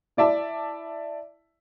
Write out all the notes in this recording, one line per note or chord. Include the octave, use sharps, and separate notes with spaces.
E4 D5 E5 A5